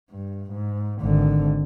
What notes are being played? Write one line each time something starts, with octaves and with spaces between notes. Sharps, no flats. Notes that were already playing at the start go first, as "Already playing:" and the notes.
G2
G#2
G#1 D3